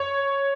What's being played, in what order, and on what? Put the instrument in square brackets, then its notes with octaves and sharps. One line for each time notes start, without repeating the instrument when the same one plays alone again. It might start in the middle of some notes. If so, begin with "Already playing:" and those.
Already playing: [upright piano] C#5